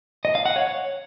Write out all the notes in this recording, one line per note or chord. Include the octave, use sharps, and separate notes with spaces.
D#5
F5
F#5
C#5